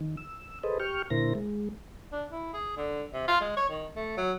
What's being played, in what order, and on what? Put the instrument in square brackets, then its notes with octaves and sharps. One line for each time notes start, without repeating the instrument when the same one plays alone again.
[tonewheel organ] D#3
E6
G#4 A4 B4 C5 D#5
G4 G5 C#6 F6
A#2 D3 E4 A#4 C5 A#6
G#3
[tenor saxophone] D4
E4
G#4
D3
C3
F4
G#3
C#5
D#3
A3
F#3